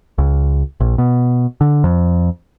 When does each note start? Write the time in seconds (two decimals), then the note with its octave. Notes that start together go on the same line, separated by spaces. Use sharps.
0.18 C#2
0.80 A#1
0.98 B2
1.61 D3
1.84 F2